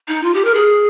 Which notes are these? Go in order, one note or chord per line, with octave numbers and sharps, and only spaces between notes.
D#4
F4
G4
A#4
G#4